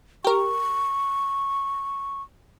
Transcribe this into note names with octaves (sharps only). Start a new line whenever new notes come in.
G4 A#4 C#6